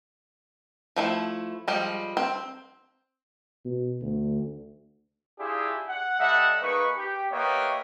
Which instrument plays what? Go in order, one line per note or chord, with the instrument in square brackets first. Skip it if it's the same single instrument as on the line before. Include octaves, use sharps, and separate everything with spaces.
[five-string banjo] F3 A3 E4
F3 G3 G#3
C4
[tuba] B2
D2
[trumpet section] D4 E4 F4 G4 G#4
F#5
G3 A4 D#5 E5 F#5
A#3 D#4 G#4 B4 C#6
G4
A#3 B3 G4 C#5 D#5 E5